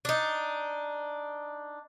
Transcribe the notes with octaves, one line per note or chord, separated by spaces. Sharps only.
D4 D#4